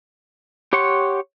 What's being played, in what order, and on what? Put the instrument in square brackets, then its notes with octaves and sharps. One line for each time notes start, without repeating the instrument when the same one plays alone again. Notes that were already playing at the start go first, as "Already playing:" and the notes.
[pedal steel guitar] G4 C#5 F#5 C6 C#6